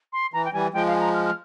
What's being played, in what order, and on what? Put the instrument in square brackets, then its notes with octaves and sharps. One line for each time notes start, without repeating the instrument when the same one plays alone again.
[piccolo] C6
[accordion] E3 [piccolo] A#5
[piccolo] G5
[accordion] E3 G3 [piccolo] G#5
[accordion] F3 G#3 [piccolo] G5
[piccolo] F5
G#5
A#5
F6
F6